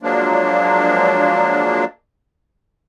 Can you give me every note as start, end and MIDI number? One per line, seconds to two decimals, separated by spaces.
0.02 1.85 53
0.02 1.85 54
0.02 1.85 56
0.02 1.85 58
0.02 1.85 62